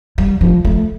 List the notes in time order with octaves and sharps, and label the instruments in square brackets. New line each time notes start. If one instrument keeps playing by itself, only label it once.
[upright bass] G3
F3
A3